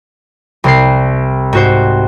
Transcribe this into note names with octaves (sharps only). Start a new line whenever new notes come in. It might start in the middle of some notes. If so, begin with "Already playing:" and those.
C2 C4 C7
G#2 F#4 C5